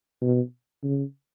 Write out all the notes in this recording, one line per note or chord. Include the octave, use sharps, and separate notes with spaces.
B2
C#3